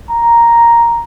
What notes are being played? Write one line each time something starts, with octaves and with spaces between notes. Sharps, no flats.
A#5